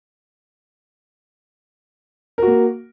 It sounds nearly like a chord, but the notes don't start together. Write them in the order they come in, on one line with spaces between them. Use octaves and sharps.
A#4 F#4 A#3